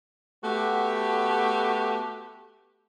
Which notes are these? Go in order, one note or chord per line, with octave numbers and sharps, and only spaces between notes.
A3 B3 F#4 G4